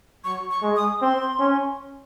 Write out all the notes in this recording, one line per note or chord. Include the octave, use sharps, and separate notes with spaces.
F#3 C#6
C#6
G#3
D#6
C4 C6
C#4